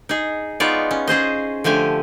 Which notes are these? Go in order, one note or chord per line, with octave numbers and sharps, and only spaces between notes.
D#4 G#4
G#3 B3 D#4 F4 C#5 D5
C#4
C#4 G#4 C5 D#5
D3 F3 A3 G4 G#5